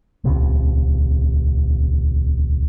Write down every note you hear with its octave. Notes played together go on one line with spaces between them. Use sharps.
D#1 C#2 C3